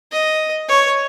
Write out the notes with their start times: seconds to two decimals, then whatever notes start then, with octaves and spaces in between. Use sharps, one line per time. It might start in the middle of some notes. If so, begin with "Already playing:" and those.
0.12 D#5
0.68 C#5